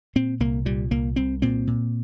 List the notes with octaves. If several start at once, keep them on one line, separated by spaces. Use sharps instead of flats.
A#2 C4
C2 A#3
A#2 G3
C2 A#3
C2 C4
A#2 C4
A#2